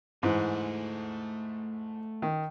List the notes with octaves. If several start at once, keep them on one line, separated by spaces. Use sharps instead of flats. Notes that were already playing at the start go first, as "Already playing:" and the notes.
G#2 E3 A3 F#5
D#3